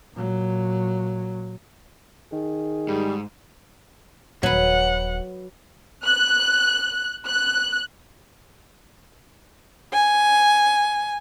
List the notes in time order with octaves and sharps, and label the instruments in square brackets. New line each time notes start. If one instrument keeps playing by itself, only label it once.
[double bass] A#2 F#3
[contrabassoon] D#3 [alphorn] G#4
[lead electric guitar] G#2 [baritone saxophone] G3
[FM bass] D#1 [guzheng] F#3 B4 [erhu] F#5
[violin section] F#6
F#6
[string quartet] G#5